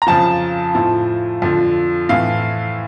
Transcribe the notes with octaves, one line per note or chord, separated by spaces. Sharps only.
A#5
F2 C#3 F3 A5
A2 F3
F2 D3 F3
A2 E3 F5